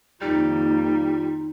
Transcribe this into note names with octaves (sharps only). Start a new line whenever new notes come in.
F2 D#3 G3 A#3 D#4 F4